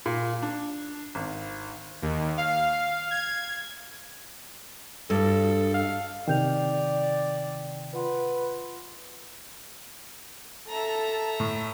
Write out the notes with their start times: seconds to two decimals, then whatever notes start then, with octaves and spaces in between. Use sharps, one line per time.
0.06 A#2
0.43 D4
1.15 G#1
2.02 D#2
2.37 F5
3.11 G#6
5.10 G2 A4
5.74 F5
6.28 C3 D#3 D5 G5 G6 F7
7.94 F4 B4 F#5 C6
10.69 A4 E5 A5 A#5
11.40 A2